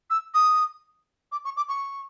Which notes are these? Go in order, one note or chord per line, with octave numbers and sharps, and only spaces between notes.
E6
D#6
D6
C#6
D6
C#6